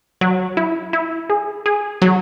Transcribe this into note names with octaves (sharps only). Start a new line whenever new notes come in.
F#3
E4
E4
G#4
G#4
F#3